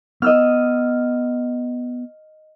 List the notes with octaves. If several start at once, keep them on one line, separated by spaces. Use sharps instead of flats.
B3 D#5 E6 F6